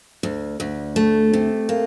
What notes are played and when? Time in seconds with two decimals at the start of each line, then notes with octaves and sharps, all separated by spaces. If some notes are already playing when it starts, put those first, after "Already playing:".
0.23 D2
0.60 D2
0.96 A3
1.33 C3
1.69 A#3